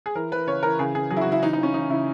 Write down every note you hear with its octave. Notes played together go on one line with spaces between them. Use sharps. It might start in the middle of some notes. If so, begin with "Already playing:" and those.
G#4
E3 A#4
E3 B4
C#3 C#5
E3 A#4
C#3 G#4
C#3 G#4
F#3 G#4
E4
F#4
C#3
E4
E3 D#4
D#4
E3 C#4
E3 D#4
C#3 E4